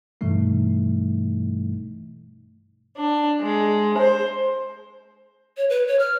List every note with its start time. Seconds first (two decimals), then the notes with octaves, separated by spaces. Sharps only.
0.21 G2 B2 E3 G3 A3 D#4
2.98 D4
3.42 G#3
3.98 C5
5.57 C#5
5.70 B4
5.87 C#5
5.99 F6